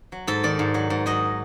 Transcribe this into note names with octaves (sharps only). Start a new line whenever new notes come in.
F#3
G#2 A4
D#3 D5
G#2
F#3
G#2
F#3 D#5